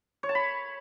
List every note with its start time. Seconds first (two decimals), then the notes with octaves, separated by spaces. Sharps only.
0.23 C#5
0.29 A5
0.35 B5